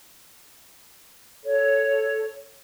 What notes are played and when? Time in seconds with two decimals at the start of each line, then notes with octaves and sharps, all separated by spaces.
1.44 A4 C#5